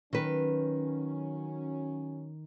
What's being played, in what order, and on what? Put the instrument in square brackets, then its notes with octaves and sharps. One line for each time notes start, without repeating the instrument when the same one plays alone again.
[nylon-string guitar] D#3 B4 [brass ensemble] F#3 C#4